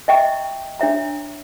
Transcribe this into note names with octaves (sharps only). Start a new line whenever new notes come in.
D#5 E5 G5 A#5 C#6
D4 C#5 E5 A#5